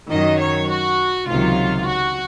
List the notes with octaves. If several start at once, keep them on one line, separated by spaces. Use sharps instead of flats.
F#2 D#3 F#3 D#5
C#5
F#4
C#2 C3 D#3 F#3 F4
F#4